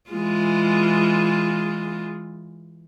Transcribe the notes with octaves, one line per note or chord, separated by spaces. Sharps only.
E3 G#3 F4